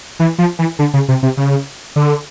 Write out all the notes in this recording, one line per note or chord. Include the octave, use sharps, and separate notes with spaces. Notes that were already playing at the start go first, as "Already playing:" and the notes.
E3
F3
E3
D3
C#3
C3
C3
C#3
D3